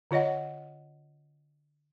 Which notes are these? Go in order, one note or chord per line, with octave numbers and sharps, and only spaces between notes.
D3 F4 C#5 D#5 F#5